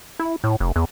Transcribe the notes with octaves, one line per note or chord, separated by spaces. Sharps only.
E4
A2
F1
E2